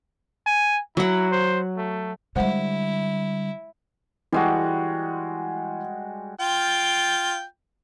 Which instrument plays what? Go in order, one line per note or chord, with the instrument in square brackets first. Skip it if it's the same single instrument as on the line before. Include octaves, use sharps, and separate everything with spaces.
[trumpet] G#5
[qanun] F#3 F#5 [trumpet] E4
[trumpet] C5
A3
[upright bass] D3 G3 [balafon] G#3 C5 F#5 [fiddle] E4
[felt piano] E3 [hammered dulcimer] G3 G#3 F#4
[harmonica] F4 G5